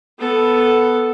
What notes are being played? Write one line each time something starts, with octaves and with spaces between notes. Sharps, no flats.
B3 A4